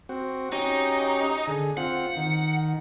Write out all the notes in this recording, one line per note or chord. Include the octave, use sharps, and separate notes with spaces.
C4 F#4
C#4 D#4 F#4 G4
D3 G#4
C4 F4 F#5
D#3